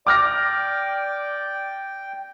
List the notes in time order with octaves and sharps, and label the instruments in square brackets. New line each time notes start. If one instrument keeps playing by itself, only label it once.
[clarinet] D5 [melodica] G5 [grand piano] D6 F6 A#6